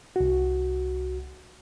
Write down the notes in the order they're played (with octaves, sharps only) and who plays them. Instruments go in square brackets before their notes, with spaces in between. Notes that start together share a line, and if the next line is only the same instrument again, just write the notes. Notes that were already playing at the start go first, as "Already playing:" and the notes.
[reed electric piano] C2 F#4